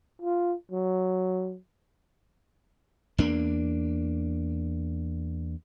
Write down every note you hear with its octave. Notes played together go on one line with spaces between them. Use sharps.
F4
F#3
E2 A#3 D4